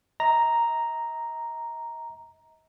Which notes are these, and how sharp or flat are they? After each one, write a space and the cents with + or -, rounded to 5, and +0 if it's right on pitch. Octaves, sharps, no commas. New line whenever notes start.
D#5 +40 A#5 +0